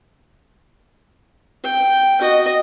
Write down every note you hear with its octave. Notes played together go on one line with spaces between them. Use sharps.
G5
F#4 D#5